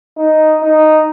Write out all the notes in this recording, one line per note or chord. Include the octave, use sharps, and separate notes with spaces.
D#4
D#4